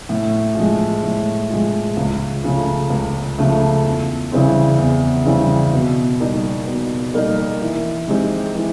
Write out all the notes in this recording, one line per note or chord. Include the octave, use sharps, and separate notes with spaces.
A2
F3 G#3
A2
F3 G#3
C#2
C#3 F3 A3
C#2
C#3 F3 A3
E2
C#3 E3 G3 C4
E2
C#3 E3 G3 C4
B2
G3 A#3 D#4
B2
G3 A#3 D#4
E3
G#3 C4 D#4 G4
E3